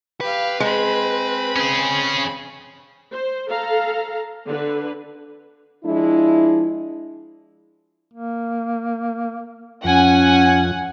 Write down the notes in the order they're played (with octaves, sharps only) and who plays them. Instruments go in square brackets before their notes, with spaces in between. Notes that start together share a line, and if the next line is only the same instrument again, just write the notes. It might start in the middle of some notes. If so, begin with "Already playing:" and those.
[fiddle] G4 F5 [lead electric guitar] B4
[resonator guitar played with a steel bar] G#3 [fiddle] C4 B5
[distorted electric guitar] C#4 G#4
[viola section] C5
A4 F5 A#5
D3 B4
[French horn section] F3 G#3 D4 E4
[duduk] A#3
[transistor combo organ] F2 [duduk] C#4 [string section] F#5 G#5